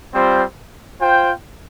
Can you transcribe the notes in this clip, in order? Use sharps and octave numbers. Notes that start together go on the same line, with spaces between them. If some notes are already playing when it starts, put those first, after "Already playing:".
G3 C4 F4 C5
F4 C5 G5